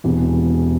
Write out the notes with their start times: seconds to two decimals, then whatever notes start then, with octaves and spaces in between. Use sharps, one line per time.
0.04 E1 E2 C3 E3